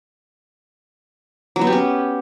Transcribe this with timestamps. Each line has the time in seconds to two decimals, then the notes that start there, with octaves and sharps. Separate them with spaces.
1.56 F#3
1.61 B3
1.67 G4
1.72 C#4